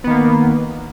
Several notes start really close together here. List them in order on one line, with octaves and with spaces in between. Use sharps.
B3 D#3 A#3